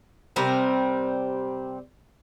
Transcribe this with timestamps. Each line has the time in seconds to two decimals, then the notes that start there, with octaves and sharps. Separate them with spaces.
0.36 C3 G3 C4 A#4